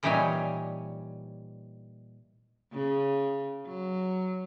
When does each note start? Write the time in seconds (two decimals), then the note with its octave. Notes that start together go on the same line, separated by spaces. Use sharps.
0.03 A#2 E3 G3 D#4 C#5 G#5
2.72 C#3
3.66 F#3